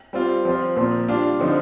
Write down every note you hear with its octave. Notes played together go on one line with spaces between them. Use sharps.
G3 C4 F4
F3 C4 F4
A#2 F3 C4
G3 D4 F4
D3 F3 C4 D#4